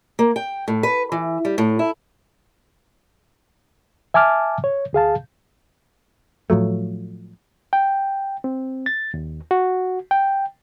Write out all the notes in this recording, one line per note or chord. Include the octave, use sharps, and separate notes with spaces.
A#3
G5
A2
B4
E3
G3
A2
E4
E5 G#5 A5 D6 F6
C#5
D2 G#4 F5 A5
A2 F3 F#3 A3
G5
C4
A6
D#2
F#4
G5